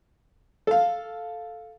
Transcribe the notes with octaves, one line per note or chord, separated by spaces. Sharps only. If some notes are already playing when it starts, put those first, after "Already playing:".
A4 F5